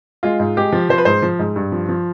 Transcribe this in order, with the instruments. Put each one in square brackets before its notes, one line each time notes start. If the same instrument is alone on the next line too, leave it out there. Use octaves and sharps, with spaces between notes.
[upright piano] G#3 F4
G#2
G#3 G4
F3
F3 C5
B4
G#2 C5
F3
G#2
G2
F3
F3